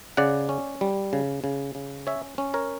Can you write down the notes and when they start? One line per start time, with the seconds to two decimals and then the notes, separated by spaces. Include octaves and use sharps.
0.17 C#3 D5 F#5
0.49 C#4
0.81 G3
1.13 C#3
1.44 C#3
1.75 C#3
2.07 C#4 C#5 E5
2.38 C#4
2.54 A#4 C#5